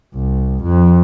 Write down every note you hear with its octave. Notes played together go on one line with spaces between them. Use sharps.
C2
F2